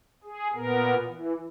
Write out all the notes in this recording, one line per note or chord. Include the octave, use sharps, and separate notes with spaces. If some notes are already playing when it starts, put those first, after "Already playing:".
G#4
A#2 B3 A#4
E3